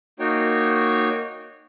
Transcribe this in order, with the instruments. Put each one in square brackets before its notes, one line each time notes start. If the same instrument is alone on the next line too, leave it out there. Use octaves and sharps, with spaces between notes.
[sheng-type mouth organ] A#3 D#4 F#4 C#5 G5